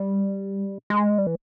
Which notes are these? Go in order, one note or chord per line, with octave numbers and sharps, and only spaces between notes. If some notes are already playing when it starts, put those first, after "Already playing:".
Already playing: G3
G#3
G3
E3